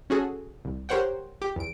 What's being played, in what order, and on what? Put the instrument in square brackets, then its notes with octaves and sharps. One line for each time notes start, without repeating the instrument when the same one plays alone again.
[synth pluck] C#4 F#4 G#4 A4
C2
G4 A#4 C5 C#5 F#5 G5
G4
E2 D7